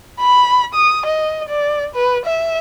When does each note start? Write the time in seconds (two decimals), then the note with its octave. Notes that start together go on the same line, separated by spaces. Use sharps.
0.20 B5
0.74 D#6
1.06 D#5
1.49 D5
1.95 B4
2.25 E5